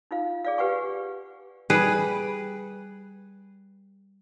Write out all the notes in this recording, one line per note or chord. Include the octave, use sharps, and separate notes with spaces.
D#4 F4 F5
G#4 D5 F5
G4 B4 F#5 G#5 C#6
G3 G#4 B4